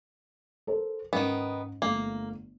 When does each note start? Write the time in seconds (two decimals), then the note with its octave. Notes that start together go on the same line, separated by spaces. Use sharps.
0.67 A4 A#4 C5
1.13 G#2 D#3 B3 C#4
1.82 G1 A3 A#3